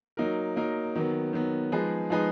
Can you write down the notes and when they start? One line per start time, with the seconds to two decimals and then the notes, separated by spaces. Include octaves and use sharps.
0.17 F#3 A#3 D#4 A#4
0.56 F#3 A#3 D#4 A#4
0.95 D#3 F#3 B3
1.33 D#3 F#3 B3
1.72 F3 G#3 D#4 G#4 B4
2.10 F3 G#3 D#4 G#4 B4